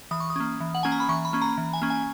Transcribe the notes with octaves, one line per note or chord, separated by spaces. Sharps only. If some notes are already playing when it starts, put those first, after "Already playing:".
E3 D#6
C#6
D#6
A#3 C#4
E3
F#5
A#3 C#4 G#5
A#5
B5
E3 C#6
B5
A#3 C#4
A#5
E3
G#5
A#3 C#4
G#5